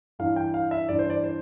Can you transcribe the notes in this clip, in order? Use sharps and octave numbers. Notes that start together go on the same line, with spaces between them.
G2 E3 F5
G5
F5
E5
G2 E3 D5
C5
D5
C5